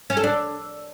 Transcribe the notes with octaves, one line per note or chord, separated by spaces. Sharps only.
C#4
A4
D4